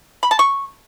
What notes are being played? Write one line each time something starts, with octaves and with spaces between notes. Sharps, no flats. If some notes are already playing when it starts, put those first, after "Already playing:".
B5
A5
C#6